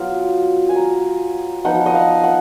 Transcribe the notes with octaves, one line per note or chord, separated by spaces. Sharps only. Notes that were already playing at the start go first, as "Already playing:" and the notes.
Already playing: F#3 B3 F4
G#5
A#5
F3 B3 D#4 F#5
D#5
F5
F#5